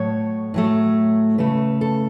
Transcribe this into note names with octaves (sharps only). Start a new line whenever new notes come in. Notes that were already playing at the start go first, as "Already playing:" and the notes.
Already playing: A2 F#3 A3 C#5
A2 F#3 A3
C#3 A3 B4
A4